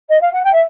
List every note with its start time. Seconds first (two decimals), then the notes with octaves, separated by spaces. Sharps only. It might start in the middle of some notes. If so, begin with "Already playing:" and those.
0.09 D#5
0.21 F5
0.33 F#5
0.44 G5
0.53 E5